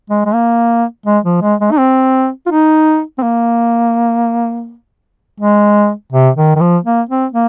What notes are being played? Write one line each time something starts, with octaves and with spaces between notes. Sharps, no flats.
G#3
G#3
A#3
G#3
F3
G#3
G#3
D#4
C4
F4
D#4
C4
A#3
G#3
C3
D#3
D#3
F3
A#3
C4
A#3